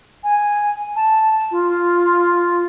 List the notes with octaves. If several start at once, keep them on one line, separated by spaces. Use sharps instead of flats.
G#5
A5
F4